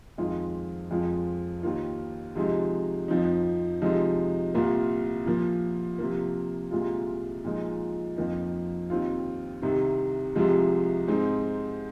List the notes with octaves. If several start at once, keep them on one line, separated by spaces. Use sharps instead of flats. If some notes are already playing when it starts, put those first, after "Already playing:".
F2 D#3 G#3 F4
F2 F3 G#3 F4
D#2 D#3 A#3 F4
C3 F3 G#3 D#4
F2 F3 C4 D#4
C3 F3 G#3 D#4
C2 A#2 A#3 F4
A#2 F3 A#3
C3 F3 A#3
C2 A#2 G#3 F4
A#2 F3 G#3 D#4
F2 F3 A#3 D#4
D#2 D#3 C4 F4
C2 C3 D#3 C4
C2 C3 F3 G#3
G#2 G#3 C4 D#4